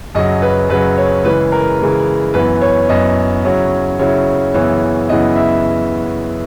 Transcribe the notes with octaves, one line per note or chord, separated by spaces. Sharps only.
F#2 C#3 F#3 D#5
B4
F#2 C#3 F#3 B4
C#5
C#3 E3 G#3 B4
A#4
C#3 E3 G#3
F#2 E3 B3 B4
C#5
F#2 E3 B3 D#5
C#3 F#3 C#4 E4
C#3 F#3 C#4 E4 C#5
F#2 C#3 E3 B3 E4 C#5
F#2 C#3 E3 B3 E4 D#5
E5